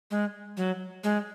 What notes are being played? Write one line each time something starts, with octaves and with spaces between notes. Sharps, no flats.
G#3
F#3
G#3